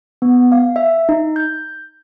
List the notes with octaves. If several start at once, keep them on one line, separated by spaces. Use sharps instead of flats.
B3
F5
E5
D#4
G6